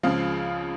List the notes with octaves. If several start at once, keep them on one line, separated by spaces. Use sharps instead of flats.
C#2 C#3 F3 F5